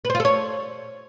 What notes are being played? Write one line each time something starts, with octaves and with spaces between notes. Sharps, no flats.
B4
C5
F4
A4
C#5